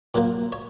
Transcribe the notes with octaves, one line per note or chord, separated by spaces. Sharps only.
A#2 F#3 A#3
C#5